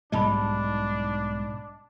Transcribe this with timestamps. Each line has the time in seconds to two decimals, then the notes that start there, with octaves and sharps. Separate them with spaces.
0.12 B1 G#2 G3 D4 D#5 A5 B5